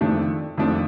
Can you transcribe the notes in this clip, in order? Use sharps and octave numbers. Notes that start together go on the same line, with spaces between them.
F2 D#3 A3 D4
F2 D#3 A3 D4